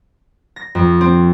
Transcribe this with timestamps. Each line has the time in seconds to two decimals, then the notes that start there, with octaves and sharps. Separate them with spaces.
0.56 A#6
0.75 F2
1.01 C4